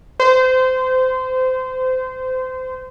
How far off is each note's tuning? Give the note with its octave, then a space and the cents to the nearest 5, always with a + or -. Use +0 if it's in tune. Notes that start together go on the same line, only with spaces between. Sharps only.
C5 -25